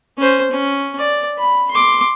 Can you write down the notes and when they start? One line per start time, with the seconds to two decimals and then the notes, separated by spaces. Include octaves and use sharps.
0.18 C#4 C5
0.51 C#4
0.99 D5
1.38 B5
1.71 C6 D6